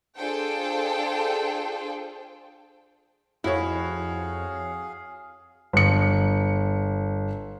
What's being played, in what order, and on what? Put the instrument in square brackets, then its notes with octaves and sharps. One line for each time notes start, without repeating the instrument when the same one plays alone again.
[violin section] D4 F4 G#4 A4 C5 G5
[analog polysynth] F2 [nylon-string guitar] E4 [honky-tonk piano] F#4 C#5 [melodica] G#4 F5
[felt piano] G1 C#7